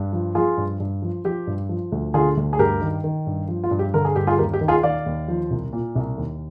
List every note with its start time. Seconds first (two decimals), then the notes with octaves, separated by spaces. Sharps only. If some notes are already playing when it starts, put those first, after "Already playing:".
Already playing: G2
0.13 F3
0.35 F3 F4 G#4
0.57 G2
0.80 G2
1.02 F3
1.25 F3 G4
1.47 G2
1.69 F3
1.92 D2
2.14 D3 F4 G#4
2.37 D2
2.53 G#4
2.59 G2 G4 A#4
2.81 D#3
3.04 D#3
3.27 G2
3.48 F3
3.64 F4
3.71 G2
3.79 G4
3.94 D3 A#4
4.05 G#4
4.16 G2 G4
4.27 F4 G#4
4.38 D#2 G4 A#4
4.53 G4
4.61 D#3
4.68 F4 G#4
4.83 D#3 D5 F5
5.06 D#2
5.28 F3
5.51 C2
5.73 A#2
5.95 C2
6.18 D#2